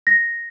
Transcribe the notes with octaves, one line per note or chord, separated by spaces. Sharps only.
A#6